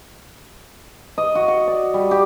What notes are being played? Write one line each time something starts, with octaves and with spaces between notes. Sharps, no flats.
D#5
F#4
F#5
D5
G3
G4